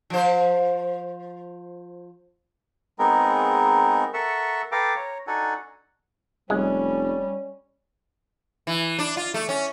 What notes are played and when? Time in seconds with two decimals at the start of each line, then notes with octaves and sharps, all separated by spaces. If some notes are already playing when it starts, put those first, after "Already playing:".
0.10 F3 C5
2.99 G#3 B3 C4 D#4 G#4 A#4
4.14 A4 A#4 E5 F#5 C#6 E6
4.72 A4 B4 F5 G5 A#5 D6
4.96 C#5 A#5
5.27 D4 D#4 F#4 A4 F#5 G#5
6.50 F1 G3 G#3 C#4
8.67 E3
8.99 D4
9.17 F4
9.34 A3
9.49 C#4